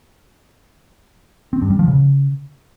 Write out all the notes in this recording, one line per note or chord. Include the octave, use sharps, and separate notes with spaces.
C4
G2
G3
F3
C#3